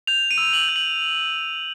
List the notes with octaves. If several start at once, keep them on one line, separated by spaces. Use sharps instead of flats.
G6 F7
D#7
E6
F#7
G6
F#7